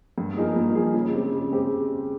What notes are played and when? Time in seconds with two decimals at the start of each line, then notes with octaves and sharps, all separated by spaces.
0.18 G2
0.37 F3 A#3 D#4 G#4
0.56 G2
0.75 F3 A#3 D#4 G#4
0.94 C#3
1.13 G#3 C4 G4
1.32 C#3
1.51 G#3 C4 G4